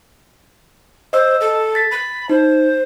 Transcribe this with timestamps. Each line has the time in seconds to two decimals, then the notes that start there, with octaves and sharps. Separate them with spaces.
1.13 C5 D#5 E6
1.41 A4
1.75 A6 B6
1.91 B5
2.29 D#4 C5